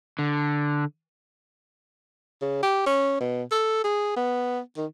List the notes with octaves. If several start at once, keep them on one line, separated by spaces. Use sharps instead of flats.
D3
C#3
G4
C#4
B2
A4
G#4
B3
D#3